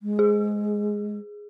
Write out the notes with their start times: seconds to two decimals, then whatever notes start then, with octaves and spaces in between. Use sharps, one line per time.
0.03 G#3
0.19 G#4